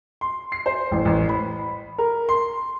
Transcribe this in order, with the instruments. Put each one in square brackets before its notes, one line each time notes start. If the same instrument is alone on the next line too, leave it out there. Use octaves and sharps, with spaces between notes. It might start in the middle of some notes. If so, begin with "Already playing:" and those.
[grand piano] C6
C7
C5
A1
A1
B5
A#4
C6